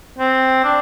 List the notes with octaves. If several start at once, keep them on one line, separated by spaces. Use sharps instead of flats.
C4
D4